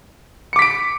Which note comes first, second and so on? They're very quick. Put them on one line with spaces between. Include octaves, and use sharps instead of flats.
C#7 D6 B6 D7